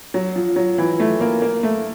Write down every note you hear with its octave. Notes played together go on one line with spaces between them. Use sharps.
F#3
F3
F#3
E3
A3
A#3
A#3
A3